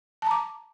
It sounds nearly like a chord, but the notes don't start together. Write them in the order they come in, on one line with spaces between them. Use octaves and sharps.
A5 A#5 D6